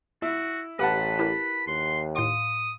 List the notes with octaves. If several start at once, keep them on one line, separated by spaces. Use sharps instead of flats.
E4 F#4 E5
A1 G4 B4 F#5 G5 A5 B5
E4 G4 A#4
D#2 C6
A2 F5 C6 D#6